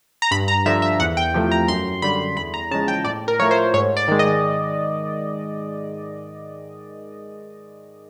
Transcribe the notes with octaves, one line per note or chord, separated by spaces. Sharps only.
A#5
G2 B5
A#5
D3 F3 E5
E5
E2 F#5
G5
C3 F3 A3
A#5
F#2 C6
D3 G3 B5
E2 B5
A#5
C#3 F3 G#3 A5
G5
A2 D5
A#4
F3 A3 C#5
C5
G#2 C#5
D5
D#3 G#3
D#5